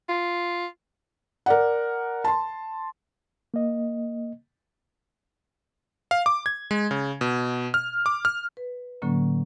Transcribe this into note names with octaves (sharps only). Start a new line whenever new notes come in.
F4
A#4 D5 F#5
A5 C6
A#3 D#5
F5
D6
G#6
G#3
C#3
B2
F6
D6
F6
B4
A2 D3 F#3 A#3 C#4